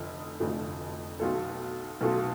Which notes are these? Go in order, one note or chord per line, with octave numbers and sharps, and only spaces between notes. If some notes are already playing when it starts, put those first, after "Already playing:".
Already playing: F1 F2 D3 F3
F1 F2 D3 F3 A3
B1 B2 A3 F4 A4
B1 B2 A3 F4 A4